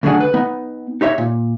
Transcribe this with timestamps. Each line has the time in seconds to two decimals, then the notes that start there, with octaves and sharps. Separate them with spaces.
0.03 D2 D3 F#3 D4 G#4 F#5
0.21 B4
0.34 B3 D#4
1.01 D#4 G4 C#5 E5
1.18 A#2